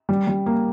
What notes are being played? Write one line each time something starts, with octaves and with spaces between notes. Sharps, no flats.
G3
G3
A#3